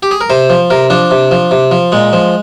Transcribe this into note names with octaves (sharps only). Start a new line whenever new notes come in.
G4
G#4
A#4
C3 C5
F3
C3 A#4
F3 D4
C3
F3
C3
F3
A#2 G#3
F3